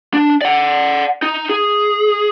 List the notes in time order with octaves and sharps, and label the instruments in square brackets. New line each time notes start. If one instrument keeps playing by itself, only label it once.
[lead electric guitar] D4
D5 F#5
D#4
G#4